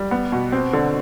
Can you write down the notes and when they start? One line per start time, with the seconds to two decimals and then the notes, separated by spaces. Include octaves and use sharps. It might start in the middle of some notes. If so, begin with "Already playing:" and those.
Already playing: G3
0.11 B3
0.32 B2
0.52 C4
0.73 D3